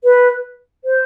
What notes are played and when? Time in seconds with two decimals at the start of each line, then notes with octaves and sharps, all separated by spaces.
0.05 B4
0.84 C5